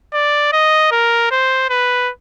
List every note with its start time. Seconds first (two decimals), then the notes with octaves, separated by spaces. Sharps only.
0.14 D5
0.53 D#5
0.91 A#4
1.31 C5
1.70 B4